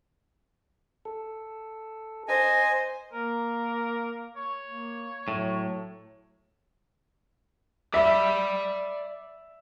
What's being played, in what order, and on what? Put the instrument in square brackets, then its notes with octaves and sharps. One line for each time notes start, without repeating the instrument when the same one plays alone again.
[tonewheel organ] A4
[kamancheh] C5 [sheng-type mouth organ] D#5 G#5
[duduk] A#3 [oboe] A#4
[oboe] C#5
[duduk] A#3
[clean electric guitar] A2 [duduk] F#3
[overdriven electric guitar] D5 B5 [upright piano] E5